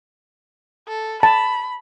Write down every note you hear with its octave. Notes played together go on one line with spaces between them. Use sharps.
A4
A5 B5